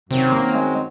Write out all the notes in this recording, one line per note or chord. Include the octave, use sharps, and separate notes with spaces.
F#2 C3 D#3 F#3 C4
A#3
G#3